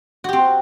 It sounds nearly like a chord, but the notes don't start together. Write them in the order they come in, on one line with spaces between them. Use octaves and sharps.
F#4 G4 C4